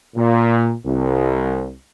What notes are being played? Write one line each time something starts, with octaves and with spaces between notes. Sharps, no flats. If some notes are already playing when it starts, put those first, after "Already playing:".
A#2
C2